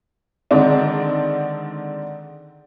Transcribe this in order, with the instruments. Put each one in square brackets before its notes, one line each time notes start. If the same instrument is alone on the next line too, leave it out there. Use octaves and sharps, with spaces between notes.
[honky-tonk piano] D3 D#3 G#3 C4 D4